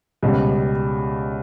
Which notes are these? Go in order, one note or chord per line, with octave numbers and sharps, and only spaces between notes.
C#2 B2 G3